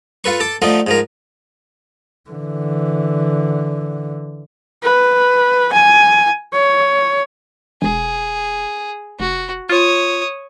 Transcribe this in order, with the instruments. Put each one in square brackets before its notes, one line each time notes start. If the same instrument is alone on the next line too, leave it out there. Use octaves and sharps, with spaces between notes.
[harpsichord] F4 A4 B4 C#6
A4 A5 D6
D3 F3 A3 D#4 F4
G#2 F3 A#4
[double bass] D3 E3
[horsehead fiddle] B4
G#5
C#5
[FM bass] E1 [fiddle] G#4
[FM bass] F1 [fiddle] F#4
[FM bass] F4 [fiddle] C#5 D#6